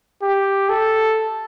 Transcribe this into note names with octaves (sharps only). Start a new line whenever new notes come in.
G4
A4